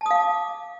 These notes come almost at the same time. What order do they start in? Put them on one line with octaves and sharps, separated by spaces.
A5 D#6 F5 D6